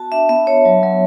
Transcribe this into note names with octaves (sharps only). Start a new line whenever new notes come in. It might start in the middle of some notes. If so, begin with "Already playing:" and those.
Already playing: B3 F#4 A5
D4 E5
B3 E5
B3 C#5
F#3
F#3